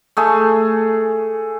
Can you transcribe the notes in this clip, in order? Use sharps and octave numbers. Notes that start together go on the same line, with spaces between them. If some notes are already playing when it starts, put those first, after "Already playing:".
A3 G#4